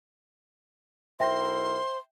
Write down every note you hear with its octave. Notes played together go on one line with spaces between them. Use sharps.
B1 E4 A#4 C5 E5 G5 C6 A#6